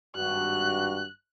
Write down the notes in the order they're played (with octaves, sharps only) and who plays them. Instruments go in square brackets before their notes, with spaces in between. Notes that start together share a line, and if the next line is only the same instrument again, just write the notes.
[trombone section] G#1 G2 [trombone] F#4 [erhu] F#6